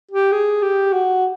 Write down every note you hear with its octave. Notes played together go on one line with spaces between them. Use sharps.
G4
G#4
G4
F#4